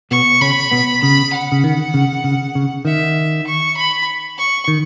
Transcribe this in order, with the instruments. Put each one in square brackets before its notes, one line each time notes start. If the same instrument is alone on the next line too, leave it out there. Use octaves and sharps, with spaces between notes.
[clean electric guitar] B2 B3 [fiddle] C#6
[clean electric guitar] C#3 C#4 [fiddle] B5
[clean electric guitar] B2 B3
[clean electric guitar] C#3 [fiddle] B5
[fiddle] F#5
[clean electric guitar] C#3
D#3
C#3
C#3
C#3
[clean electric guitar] D#3 [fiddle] E5
[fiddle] C#6
B5
C#6
[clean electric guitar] D#3